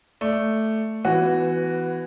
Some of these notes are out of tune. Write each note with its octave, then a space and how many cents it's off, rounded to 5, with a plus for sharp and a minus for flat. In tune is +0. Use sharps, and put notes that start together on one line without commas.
A3 +0 D5 +0
E3 +0 B3 +25 F#4 +0